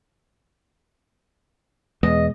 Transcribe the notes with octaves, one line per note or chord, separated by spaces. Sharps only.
E2 B2 G#3 D#5